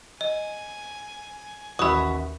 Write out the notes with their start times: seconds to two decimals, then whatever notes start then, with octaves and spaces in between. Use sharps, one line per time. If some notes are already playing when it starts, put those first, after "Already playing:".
0.21 D#5 G#5
1.79 A1 D#2 F#4 E5 B5 D#6